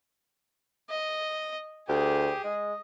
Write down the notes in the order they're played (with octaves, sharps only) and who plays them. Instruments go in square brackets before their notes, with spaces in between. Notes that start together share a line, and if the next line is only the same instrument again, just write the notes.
[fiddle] D#5
[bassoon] D2 [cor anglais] G4 [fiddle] G#4
[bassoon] G#3 [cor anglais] D#5